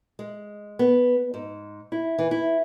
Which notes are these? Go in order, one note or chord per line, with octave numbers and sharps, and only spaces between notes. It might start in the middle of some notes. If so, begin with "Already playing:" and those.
G#3
B3
G#2
E4
E3
E4